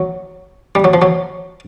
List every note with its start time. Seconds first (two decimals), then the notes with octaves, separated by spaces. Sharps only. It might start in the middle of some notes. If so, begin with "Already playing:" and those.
Already playing: F#3
0.75 G3
0.84 F#3
0.94 F3
1.02 F#3